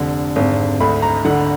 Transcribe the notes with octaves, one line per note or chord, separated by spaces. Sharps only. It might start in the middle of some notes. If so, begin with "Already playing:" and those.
Already playing: F1 D3
G#1
D2 B5
A#5
D3 F#5